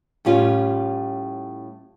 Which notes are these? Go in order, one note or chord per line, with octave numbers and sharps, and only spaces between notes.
A2 G3 C#4 F4